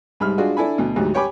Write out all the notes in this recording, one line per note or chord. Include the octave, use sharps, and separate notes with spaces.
C2 G#2 G3 B5 F6
G#3 D4 F4 F#4 G#4
D4 E4 A4 G#5 B5
D2 B2
D2 G#2 F#3 G3
G4 C#5 G5 G#5 B5 D6